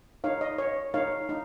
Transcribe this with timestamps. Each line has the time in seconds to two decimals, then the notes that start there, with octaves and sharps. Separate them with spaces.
0.24 D#4 C#5 F5
0.41 D#5
0.58 C#5
0.94 D#4 C#5 F5
1.29 D#4